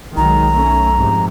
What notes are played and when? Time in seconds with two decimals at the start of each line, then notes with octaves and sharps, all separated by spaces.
0.17 B1 D#3 F#3 G#3 A#5
0.51 A3 C#4
0.96 F2 G#2 C3